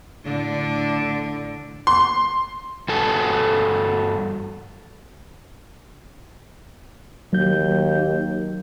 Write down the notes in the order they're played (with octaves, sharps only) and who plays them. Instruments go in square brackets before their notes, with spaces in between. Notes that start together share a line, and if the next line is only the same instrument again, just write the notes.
[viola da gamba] A2 D3 D4
[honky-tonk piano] C6
[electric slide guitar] G2 F#4 A4 G#5
[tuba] D#2 [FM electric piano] F#3 G6